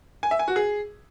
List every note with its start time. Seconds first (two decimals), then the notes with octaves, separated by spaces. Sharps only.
0.23 G#5
0.31 E5
0.39 G#5
0.48 F#4
0.56 G#4